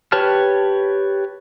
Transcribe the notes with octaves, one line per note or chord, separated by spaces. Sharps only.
G4 B4 C#5 A5 F6